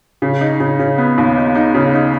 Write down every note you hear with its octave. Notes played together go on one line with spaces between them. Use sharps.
C#3
D#4
C#3
C#3
B3
D#2
D#4
D#4
C#3
D#4